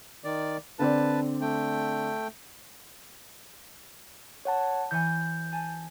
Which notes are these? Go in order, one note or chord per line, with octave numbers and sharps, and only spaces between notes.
D#3 D5
D3 C4 B4 D5 A5
A3 G5
C#5 F#5 A5
E3 C#5 G#5 G6
G#5 A5